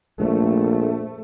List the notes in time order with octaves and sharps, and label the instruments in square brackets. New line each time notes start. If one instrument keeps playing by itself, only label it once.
[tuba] A#1 [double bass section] A3